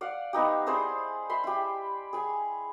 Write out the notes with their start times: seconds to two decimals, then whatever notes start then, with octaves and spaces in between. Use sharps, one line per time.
0.01 D5 F5 F#5
0.33 B3 D#4 G4
0.67 E4 G#4 C5 D5
1.29 E5 B5 C6
1.44 E4 G4
2.13 G#4 G#5